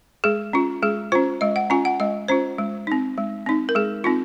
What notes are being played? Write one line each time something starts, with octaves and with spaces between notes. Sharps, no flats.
G#3 G#4
C#4 F4
G#3 G#4
C#4 F4 C5
G#3 D#5
F#5
C#4 F4 G#5
F#5
G#3 D#5
C#4 F4 C5
G#3
C4 D#4
G#3
C4 D#4
A#4
G#3 G#4
C4 D#4 F4